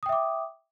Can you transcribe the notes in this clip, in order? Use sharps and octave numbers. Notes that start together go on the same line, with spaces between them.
E5 G5 D6 D#6